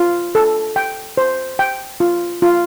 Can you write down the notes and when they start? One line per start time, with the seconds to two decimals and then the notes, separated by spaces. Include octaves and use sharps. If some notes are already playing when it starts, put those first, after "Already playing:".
Already playing: F4
0.35 A4
0.76 G5
1.17 C5
1.59 G5
2.00 F4
2.42 F4